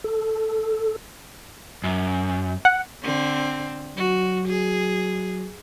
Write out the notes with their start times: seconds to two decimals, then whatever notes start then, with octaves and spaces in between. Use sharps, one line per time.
0.04 A4
1.84 F#2
2.65 F#5
3.03 D3 C4
3.97 F#3 F#4
4.48 G#4